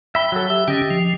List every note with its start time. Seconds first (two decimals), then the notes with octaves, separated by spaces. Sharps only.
0.15 E5 G5 B5
0.32 F#3 A4
0.50 G4 E5
0.68 D3 C#4 G4 D#5
0.91 F3